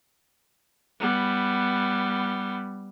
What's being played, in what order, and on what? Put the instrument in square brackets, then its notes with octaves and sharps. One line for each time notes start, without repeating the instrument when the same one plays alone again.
[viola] G3 B3